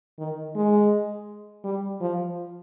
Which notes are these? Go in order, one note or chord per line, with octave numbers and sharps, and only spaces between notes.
D#3
G#3
G3
F3